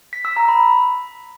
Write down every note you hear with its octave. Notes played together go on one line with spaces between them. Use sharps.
B6
E6
A#5
B5